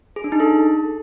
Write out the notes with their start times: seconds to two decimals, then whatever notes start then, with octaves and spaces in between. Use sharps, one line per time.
0.16 G#4
0.24 D4
0.32 D#4
0.40 A4